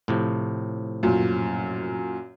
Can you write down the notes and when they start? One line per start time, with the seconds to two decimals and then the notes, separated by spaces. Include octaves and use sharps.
0.08 A2 C3 F3
1.03 F#2 A#2